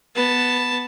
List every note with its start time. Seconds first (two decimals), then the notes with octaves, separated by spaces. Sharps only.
0.15 B3 A5